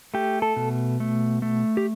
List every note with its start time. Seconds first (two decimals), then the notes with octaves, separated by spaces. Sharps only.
0.14 A3 G4
0.42 A4
0.56 B2
1.00 A3
1.42 A3
1.77 G4